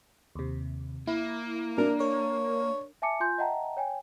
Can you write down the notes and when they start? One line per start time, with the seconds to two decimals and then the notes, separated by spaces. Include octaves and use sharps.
0.35 D#2 C3
1.07 A#3 E4
1.78 D4 A#4
2.00 A#4 C#5
3.02 E5 G#5 A5 D6 C#7
3.20 F4 G#5 C6 G6
3.38 D#5 E5 F#5 G5 A5 A#5
3.77 C#5 G5 G#5